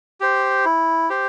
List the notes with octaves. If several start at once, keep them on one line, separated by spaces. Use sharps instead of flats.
G4 C5
E4
G4 C5